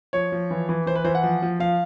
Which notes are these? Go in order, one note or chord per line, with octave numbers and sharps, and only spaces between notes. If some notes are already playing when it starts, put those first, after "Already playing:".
F3 C#5
F3
E3
E3
E3 C5
B4
E3 C5
F#5
F3
F3
F3 F5